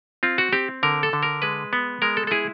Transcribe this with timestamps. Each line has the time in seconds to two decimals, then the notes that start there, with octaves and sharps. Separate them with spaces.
0.23 C4 F4
0.38 F#4
0.53 C4 G4
0.83 D3 A#4
1.03 A4
1.13 D3
1.23 A#4
1.42 G#3 B4
1.73 B3
2.02 G#3 A#4
2.17 A4
2.27 A4
2.31 E4 G#4